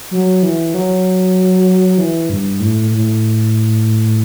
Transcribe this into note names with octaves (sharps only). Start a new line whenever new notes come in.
F#3
E3
F#3
E3
G2
A2
A2